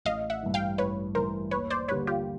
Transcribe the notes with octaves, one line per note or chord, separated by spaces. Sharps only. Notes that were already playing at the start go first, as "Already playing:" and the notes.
A1 D#5 F5
E5 F#5
G2 E3
F5 G5
A1 B4 C#5
G2 E3 A#4 C5
D#2 B4 C#5
C5 D5
D3 G3 A#3 B4 C#5
F4 G4